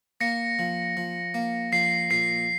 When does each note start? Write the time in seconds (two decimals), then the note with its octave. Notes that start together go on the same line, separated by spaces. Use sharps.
0.21 A#3 A#6 C#7
0.59 F3
0.97 F3
1.34 A#3
1.72 F3 C7
2.10 A#2 C7